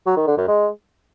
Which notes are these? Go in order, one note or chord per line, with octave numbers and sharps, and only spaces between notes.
F#3
D#3
D3
F#2
G#3